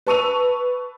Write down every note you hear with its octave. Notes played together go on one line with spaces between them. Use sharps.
B4 A5 C#6 E6 D#7 F7